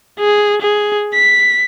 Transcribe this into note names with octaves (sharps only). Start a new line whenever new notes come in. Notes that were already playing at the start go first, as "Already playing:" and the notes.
G#4
G#4
B6